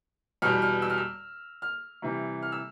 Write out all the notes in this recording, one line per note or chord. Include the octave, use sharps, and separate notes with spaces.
E2 B2 G3 F6
F6
E6
F6
E6
F6
C3 E3 G3
F6
E6